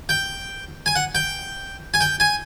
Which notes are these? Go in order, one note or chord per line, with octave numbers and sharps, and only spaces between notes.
G5
G#5
F#5
G5
G#5
G5
G#5